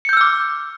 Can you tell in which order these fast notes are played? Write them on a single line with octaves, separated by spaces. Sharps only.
C#7 G6 E6 F6 D6